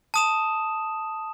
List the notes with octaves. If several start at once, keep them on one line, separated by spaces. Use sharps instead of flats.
A5 D#6 E7